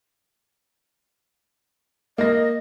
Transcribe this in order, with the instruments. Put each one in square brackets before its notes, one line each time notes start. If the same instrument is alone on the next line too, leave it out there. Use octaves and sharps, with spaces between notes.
[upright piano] A#3 A#6 [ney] D#5